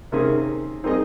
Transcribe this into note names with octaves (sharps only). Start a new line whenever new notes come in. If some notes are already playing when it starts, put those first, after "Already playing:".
C3 D#3 A#3 C#4 G#4
C4 D#4 G#4 D#5